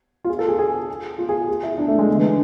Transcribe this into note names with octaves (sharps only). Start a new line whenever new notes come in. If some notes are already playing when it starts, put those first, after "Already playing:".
F4
G#4
A4
G#4
G#4
F4
G#4
G#4
E4
D4
A3
G#3
D3
E3
D3